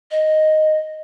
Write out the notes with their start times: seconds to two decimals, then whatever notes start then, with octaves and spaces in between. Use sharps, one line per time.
0.11 D#5